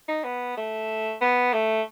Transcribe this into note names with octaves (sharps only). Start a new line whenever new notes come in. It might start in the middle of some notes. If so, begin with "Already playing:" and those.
D#4
B3
A3
B3
A3